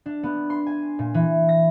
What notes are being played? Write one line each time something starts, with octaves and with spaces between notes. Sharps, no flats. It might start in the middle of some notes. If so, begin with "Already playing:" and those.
D4
B3
C6
G#5
A#2
E3
A#6